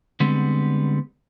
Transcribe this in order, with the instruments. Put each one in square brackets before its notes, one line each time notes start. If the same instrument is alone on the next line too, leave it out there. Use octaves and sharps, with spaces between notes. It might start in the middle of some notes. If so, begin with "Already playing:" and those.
[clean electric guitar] D3 G3 G#3 B3 C4